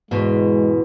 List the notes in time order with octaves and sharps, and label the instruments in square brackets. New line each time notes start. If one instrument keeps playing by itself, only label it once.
[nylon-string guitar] E2 G#2 B2 [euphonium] G#3